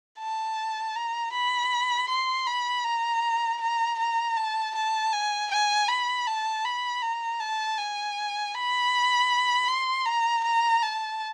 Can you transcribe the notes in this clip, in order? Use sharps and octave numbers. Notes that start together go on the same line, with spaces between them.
A5
A#5
B5
C6
B5
A#5
A#5
A#5
A5
A5
G#5
G#5
B5
A5
B5
A#5
A5
G#5
B5
C6
A#5
A#5
A5